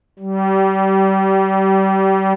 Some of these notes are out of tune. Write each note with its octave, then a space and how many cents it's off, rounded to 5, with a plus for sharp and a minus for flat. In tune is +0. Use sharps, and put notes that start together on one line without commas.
G3 -30